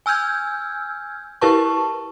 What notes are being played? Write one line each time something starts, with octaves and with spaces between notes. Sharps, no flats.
G#5 E6 F6 G6 G#6
E4 G4 A#4 B4 A5 C#6